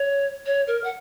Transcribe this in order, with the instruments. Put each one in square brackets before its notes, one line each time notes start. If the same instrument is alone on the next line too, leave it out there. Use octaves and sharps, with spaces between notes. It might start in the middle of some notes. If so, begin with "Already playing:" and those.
Already playing: [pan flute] C#5
C#5
A#4
F#5